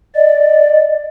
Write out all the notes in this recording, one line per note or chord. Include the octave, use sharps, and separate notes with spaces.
D5 D#5